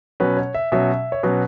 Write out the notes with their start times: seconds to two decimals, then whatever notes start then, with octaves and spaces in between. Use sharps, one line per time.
0.20 B2 F#3 C#4 B4
0.37 C#5
0.54 E5
0.72 B2 F#3 C#4 E5
1.12 C#5
1.23 B2 F#3 C#4 B4